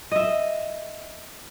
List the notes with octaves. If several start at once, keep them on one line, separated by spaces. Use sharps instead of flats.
D#5 E5